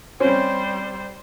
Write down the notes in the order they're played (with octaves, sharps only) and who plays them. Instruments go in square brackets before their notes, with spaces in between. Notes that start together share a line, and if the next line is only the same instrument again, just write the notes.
[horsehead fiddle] G3 C5 [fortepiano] C4 C#4